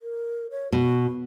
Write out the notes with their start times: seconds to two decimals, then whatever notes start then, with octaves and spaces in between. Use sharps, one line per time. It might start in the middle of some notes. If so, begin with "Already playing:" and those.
0.01 A#4
0.51 C#5
0.72 B2 F#4